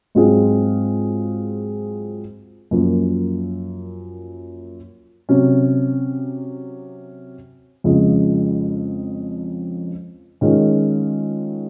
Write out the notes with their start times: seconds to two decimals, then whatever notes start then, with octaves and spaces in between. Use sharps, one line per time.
0.15 G#2 F#3 C4 F4 G#4
2.71 F#2 F3 A#3
5.29 C3 F#3 C#4
7.84 F2 C#3 F3 G#3
10.41 D#3 G#3 C#4 F4 G#4